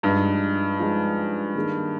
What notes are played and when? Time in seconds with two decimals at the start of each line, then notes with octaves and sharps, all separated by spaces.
0.03 G2 F3 G#3 D#4
0.79 F3 G#3 D#4
1.56 D#3 A#3 D#4 G#4